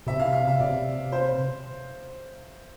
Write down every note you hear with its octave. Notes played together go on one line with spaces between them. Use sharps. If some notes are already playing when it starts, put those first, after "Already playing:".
C3 E5
F5
F5
E5
C3 D5
C5